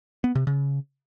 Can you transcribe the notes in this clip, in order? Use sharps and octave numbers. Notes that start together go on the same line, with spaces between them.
B3
C3
C#3